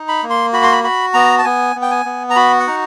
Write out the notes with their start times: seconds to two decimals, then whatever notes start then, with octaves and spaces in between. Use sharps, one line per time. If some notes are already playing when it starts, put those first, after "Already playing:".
Already playing: D#4
0.08 B5
0.23 A#3
0.30 C6
0.53 F#4 B5
0.63 C6
0.72 B5
0.83 F#4 B5
1.14 B3 A#5
1.38 A5
1.45 B3 G#5
1.76 B3
1.82 G5
1.91 G#5
2.05 B3
2.30 A#5
2.36 F#4 B5
2.60 F#5
2.67 D#4